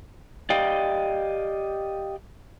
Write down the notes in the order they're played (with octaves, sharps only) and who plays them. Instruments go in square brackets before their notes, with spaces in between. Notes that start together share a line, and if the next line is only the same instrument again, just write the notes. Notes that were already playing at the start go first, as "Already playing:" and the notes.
[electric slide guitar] G4 D5 D#5 F5 G5